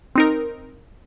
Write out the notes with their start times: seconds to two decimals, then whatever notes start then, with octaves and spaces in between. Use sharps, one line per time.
0.16 C4 D#4 A#4